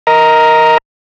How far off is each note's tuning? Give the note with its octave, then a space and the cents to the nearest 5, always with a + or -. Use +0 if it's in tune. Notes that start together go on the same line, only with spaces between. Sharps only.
A#4 +0 D#5 +25 A#5 +0